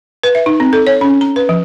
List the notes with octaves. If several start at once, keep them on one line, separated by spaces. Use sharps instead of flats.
B4
E5
D#4
C4
A4
C#5
C#4
A#5
B4
F3